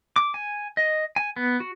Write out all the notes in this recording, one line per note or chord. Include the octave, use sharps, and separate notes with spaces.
D6
G#5
D#5
G#5
B3
F#4